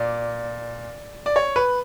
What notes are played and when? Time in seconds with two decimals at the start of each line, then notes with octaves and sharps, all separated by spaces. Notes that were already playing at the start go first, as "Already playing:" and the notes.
Already playing: A#2 D5
1.26 D5
1.36 C#5
1.56 B4